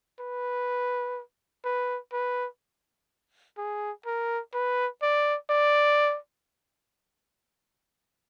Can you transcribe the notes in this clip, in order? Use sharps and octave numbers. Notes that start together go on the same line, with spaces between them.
B4
B4
B4
G#4
A#4
B4
D5
D5